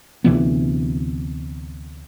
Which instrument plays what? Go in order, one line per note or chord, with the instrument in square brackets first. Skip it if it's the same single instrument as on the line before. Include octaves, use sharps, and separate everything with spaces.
[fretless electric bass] D2 C3 E3 B3